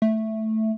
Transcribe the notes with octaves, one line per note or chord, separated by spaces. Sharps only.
A3